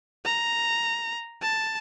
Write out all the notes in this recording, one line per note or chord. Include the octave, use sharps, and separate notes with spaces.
A#5
A5